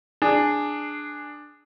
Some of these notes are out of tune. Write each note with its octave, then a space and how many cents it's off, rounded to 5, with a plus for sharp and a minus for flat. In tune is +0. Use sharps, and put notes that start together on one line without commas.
D4 +10 G#4 +0